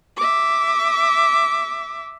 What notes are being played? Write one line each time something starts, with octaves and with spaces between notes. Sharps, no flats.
E5 D6